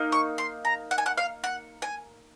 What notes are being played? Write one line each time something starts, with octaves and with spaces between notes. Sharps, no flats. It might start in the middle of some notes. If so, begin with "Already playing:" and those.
Already playing: A#3 D#4
C#6
C6
A#5
F#5
G#5
F#5
F5
F#5
G#5